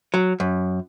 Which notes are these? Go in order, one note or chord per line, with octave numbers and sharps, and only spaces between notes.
F#3
F#2